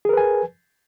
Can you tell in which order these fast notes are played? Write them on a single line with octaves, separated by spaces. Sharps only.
G#4 A#4 B4 G#5